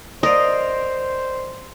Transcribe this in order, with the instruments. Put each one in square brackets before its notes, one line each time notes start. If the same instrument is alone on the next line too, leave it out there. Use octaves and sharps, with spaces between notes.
[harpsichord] A#4 D5 F5 [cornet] C5 [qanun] D#5